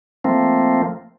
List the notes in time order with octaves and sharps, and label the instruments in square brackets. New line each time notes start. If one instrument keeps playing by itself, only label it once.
[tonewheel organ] F3 A3 A#3 C4